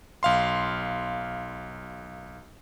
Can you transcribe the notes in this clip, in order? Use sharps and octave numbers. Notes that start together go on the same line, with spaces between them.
B1 F5 C6